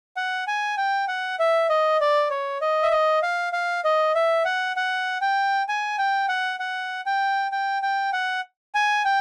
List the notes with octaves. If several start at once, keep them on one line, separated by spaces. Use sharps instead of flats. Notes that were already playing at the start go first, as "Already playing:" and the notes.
F#5
G#5
G5
F#5
E5
D#5
D5
C#5
D#5
E5
D#5
F5
F5
D#5
E5
F#5
F#5
G5
G#5
G5
F#5
F#5
G5
G5
G5
F#5
G#5
G5